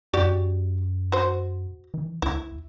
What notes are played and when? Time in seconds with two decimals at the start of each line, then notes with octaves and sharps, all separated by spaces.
0.14 F#2 F#4 G4 D5
1.12 F#4 C5
1.94 E3
2.22 D2 E4